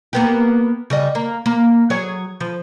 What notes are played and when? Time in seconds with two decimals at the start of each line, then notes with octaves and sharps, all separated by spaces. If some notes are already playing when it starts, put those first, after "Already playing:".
0.13 A#3 B3 G4
0.90 C#3 G3 D#5
1.15 A#3
1.46 A#3
1.90 F#3 G#4 C#5
2.41 F3